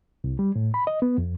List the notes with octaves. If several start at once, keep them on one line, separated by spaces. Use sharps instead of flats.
C2
G3
A2
B5
D#5
B3
F2